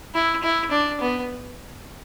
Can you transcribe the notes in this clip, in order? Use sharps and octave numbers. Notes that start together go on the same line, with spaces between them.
E4
E4
D4
B3